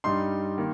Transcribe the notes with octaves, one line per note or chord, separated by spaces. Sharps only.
G2 G3 D#4 C6
D#3 A#3